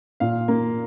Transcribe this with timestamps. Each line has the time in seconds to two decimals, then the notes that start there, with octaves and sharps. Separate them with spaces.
0.20 A#2 F5
0.48 A#3